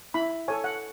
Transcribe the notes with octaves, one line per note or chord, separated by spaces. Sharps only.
E4 B5
A4 C#5 G#5
F#5